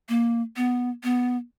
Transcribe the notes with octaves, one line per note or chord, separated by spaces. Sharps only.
A#3
B3
B3